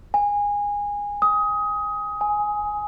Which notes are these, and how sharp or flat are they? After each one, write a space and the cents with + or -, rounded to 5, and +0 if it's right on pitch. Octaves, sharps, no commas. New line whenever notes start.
G#5 -20
D#6 +20
G#5 +5